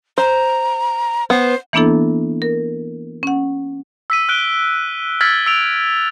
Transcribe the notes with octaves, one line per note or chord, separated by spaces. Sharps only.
C5 A#5
B3 C5
E3 A#3 B3 D4 E4 A4
A#4
C#4 F#5
E6 B6 D#7
F6 F#6 D7 G7
E6 F6 G#6 A6 B6 F#7
E6 B6 D7 F7